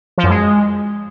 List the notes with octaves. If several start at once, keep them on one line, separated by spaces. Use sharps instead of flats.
F3
F#2
G#3